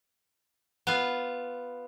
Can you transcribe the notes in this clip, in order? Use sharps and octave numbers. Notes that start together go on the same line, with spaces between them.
B3 F4